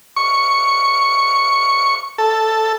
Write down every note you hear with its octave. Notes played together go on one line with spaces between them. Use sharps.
C#6
A4